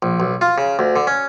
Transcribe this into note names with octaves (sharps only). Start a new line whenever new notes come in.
A#1
B1
F4
C#3
D2
D3
C#4